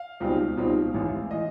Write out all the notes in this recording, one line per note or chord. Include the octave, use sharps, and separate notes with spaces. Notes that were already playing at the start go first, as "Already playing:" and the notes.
Already playing: F5
C#2 B2 G3 C4 D#4
C#2 B2 G3 C4 D#4
A1 G#2 E3
E3 D#5